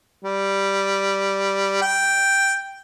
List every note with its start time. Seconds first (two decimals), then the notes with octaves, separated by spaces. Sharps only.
0.25 G3
1.82 G5